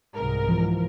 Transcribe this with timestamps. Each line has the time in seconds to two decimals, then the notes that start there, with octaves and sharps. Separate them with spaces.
0.15 C2 G#2 A#4
0.48 E3 F3